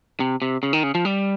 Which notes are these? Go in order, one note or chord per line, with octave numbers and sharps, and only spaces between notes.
C3
C3
C#3
D#3
C#3
F3
G3